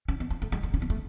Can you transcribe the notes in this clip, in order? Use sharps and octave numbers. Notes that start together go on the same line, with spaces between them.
C#4
B3
B3
A3
G#3
B3
C#4
B3
A3